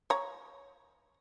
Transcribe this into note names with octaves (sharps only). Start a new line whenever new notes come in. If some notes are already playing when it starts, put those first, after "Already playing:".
C#5 A#5